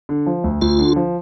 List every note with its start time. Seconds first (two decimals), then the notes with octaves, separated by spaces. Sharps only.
0.09 D3
0.26 F3
0.44 D2
0.61 D2 F4
0.79 D3
0.96 F3